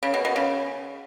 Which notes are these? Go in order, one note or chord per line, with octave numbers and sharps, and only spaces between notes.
C#3
B2
B2
C#3